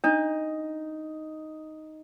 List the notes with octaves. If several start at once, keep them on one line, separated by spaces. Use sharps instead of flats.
D4 D#4